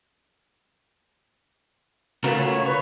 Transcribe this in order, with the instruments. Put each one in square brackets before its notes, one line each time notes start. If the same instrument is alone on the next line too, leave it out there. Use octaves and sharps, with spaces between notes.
[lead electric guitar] C#3 A3 [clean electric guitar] F4 F#4 A#4 [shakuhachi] B4
[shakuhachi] C#5
C#5
[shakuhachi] B4 [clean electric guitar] C#5